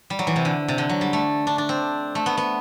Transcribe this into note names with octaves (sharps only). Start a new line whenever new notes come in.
G3
F#3
E3
C3
D3
C3
D3
F#3
G3
A3
D4
D4
C4
A3
B3
B3